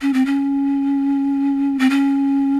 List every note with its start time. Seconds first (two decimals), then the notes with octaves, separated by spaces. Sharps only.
0.02 C#4
0.13 C4
0.26 C#4
1.79 C4
1.90 C#4